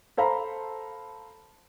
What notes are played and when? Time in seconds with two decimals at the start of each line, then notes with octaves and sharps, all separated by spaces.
0.17 A4 C5 F5 A#5 B5